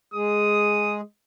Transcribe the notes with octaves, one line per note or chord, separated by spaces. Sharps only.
G#3 G#4 D#6